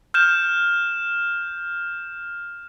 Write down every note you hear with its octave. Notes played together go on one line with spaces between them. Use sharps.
F6 G6 E7